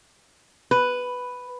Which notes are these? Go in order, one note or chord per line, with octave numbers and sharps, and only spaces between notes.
B4